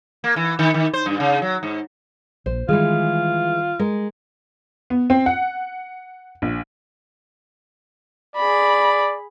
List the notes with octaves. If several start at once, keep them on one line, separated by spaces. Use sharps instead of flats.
A#3
E3
D#3
D#3
C5
G2
C#3
F#3
G#2
A#1 C5
D#3 E3 G3 G#3 F4 G#4
G#3 A#4
B3
C4
F#5
A#1
G#4 D5 B5